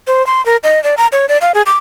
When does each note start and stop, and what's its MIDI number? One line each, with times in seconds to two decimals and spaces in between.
0.07 0.25 72
0.27 0.44 84
0.46 0.56 70
0.64 0.82 75
0.84 0.95 74
0.97 1.07 82
1.12 1.26 73
1.29 1.38 74
1.41 1.52 77
1.54 1.62 68
1.66 1.77 86